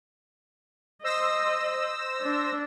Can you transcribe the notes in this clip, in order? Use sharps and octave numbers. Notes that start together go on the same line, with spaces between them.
C5 D#5 E6 A#6
D4